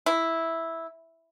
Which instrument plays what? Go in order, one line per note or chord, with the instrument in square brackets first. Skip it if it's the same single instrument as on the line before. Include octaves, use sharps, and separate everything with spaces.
[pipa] E4